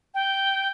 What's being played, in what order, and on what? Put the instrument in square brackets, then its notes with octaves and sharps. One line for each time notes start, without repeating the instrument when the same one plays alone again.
[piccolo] G5